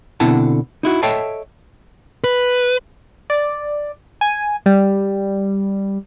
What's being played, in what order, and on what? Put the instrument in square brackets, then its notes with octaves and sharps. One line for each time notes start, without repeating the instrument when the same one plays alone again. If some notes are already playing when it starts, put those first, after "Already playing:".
[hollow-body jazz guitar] B2 D3 C4 E4 F#5 A5
D#4 E4 F#4
A4 C#5 D#5 E5 G5 A5
[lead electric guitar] B4
[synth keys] D5
G#5
G3